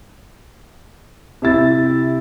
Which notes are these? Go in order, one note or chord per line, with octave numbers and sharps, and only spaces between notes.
C3 E4 A6